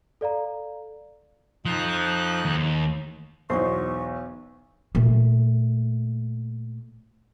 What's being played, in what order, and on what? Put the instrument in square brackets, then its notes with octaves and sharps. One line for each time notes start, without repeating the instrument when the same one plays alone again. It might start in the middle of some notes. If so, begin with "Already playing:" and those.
[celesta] A4 D5 F5 A#5
[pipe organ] F2 D#4 F#6 [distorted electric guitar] F3
[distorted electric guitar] D#2
[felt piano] B1 E2 [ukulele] D#4 F#4 C5 [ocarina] C#6
[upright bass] A#2 A3